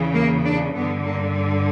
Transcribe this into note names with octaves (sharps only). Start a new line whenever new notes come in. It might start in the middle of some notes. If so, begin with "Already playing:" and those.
Already playing: E2 C#3 E3
A#3
D4
G2 D3 B3
A#3